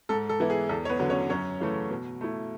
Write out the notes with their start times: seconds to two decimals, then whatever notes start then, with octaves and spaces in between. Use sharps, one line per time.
0.09 G#2 A4
0.29 A4
0.40 E3 B3 E4
0.50 G#4
0.69 E2 A4
0.85 C#5
0.89 B3 B4
1.00 D3 F#3
1.10 C#4 C#5
1.30 F#2 C#4 C#5
1.60 C#3 E3 A3
1.90 B2
2.21 A3 E4